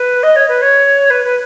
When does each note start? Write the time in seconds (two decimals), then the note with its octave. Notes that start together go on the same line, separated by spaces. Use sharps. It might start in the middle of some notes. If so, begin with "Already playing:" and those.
Already playing: B4
0.23 D#5
0.36 C#5
0.48 B4
0.62 C#5
1.10 B4
1.25 B4